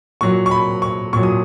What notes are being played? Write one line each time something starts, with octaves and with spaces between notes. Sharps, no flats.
A#2 F#3 C#6
C#6
B5
C#6
A#2 F#3 C#6
D#6